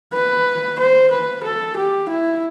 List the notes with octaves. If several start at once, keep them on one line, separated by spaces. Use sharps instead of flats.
B4
C5
B4
A4
G4
E4